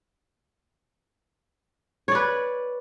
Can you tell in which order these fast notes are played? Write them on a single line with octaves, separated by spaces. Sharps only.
C#5 D5 B4